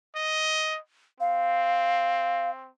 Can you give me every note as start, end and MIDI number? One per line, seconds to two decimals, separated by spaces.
0.15 0.79 75
1.20 2.68 60
1.20 2.50 77